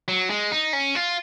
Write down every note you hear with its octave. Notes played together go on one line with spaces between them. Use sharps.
F#3
G#3
D#4
C#4
F4